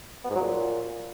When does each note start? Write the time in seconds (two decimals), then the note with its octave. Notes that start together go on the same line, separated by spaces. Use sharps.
0.24 B3
0.30 G#2
0.35 F#3
0.41 A#2